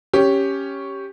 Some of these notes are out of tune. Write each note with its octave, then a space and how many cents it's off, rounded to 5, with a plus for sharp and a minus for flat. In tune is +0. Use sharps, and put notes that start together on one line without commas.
C#4 +0 G4 +0